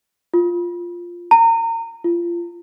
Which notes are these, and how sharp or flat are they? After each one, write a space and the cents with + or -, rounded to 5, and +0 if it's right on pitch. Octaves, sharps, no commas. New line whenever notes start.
F4 +0
A#5 -30
F4 -25